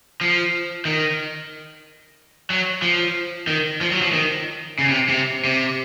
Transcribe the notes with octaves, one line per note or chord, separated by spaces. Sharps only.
F3
D#3
F#3
F3
D#3
F3
F#3
F3
D#3
C#3
C3
C3
C3